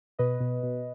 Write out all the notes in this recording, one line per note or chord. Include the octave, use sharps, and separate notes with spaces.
B2 B4 D#5
B2
B2